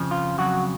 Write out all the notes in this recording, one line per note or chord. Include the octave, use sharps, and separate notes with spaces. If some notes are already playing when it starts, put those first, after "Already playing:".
Already playing: F2 C#3 F3
F4
F2 C#3 F#3 F#4